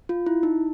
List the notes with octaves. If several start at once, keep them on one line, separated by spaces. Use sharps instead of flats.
F4
E4
D#4